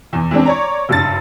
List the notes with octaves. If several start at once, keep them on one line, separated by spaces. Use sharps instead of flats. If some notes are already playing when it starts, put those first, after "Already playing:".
E2 E3
E3 G#3 C4 D4
C#5 D5 A#5
F#1 G2 A6